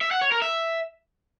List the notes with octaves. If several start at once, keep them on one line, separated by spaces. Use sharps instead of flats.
E5
F#5
C#5
A#4
E5